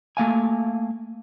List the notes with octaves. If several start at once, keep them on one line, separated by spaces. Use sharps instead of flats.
A3 A#3 F5 G#5